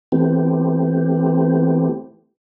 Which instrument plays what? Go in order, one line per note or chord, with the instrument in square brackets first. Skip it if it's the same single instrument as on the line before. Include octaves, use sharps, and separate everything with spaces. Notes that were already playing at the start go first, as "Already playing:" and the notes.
[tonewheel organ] E3 A3 B3 C4 G4